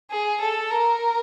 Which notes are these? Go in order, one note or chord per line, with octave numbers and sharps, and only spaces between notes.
G#4
A4
A#4